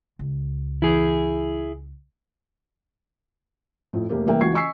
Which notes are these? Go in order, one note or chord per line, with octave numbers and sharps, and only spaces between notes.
C#2
E3 E4 G#4
F2 A2
F1 A3 A#3 G4
C2 E3 A#3 E5 G5
C#2 E3 F#4 C#6 G#6 C7
D#5 G#5 C#6 E6 B6 C7